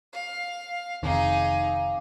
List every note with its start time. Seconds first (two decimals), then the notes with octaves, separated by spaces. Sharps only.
0.13 F5
1.03 F1 D#3 C4 D#4 G#4 F5 D6